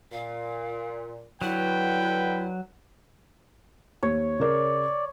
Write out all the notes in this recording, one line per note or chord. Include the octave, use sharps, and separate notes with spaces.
A#2 F5
D3 F#3 E4 B4 G5
D#2 C#5
C#3 A#4 D5